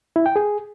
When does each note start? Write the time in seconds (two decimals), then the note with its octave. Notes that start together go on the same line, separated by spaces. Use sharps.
0.16 E4
0.26 G5
0.36 G#4